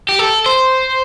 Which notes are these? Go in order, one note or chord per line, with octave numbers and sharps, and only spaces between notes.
G4
A4
C5